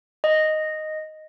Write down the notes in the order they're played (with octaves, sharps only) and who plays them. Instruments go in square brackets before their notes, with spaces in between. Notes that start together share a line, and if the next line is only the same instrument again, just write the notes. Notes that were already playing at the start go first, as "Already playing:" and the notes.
[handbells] D#5